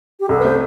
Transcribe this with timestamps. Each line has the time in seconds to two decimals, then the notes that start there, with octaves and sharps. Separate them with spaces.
0.20 G4
0.29 C2 A4
0.39 B4
0.44 A3 C5